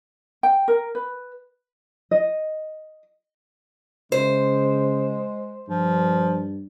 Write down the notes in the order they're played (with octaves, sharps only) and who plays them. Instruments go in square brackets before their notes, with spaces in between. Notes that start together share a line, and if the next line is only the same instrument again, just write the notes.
[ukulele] G5
A#4
B4
D#5
[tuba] C#3 [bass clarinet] G#3 [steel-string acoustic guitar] C5
[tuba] G2 [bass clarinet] F3